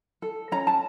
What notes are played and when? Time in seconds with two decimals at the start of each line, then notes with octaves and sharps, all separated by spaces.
0.22 A4
0.52 C#4 A#5
0.67 A5